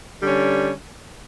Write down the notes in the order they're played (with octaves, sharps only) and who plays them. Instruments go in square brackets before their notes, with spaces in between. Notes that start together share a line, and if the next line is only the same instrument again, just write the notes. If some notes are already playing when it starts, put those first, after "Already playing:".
[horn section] D3 G3 C#4